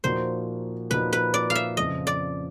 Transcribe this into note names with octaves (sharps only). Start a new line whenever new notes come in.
A#2 F3 A#3 D#4 F#4 C5
A#2 F3 A#3 D#4 F#4 B4
B4
D5
F5
E5
F2 C#3 F3 D#5
D5